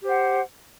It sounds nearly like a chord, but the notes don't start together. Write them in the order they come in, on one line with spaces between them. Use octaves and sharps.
G4 C5 F#5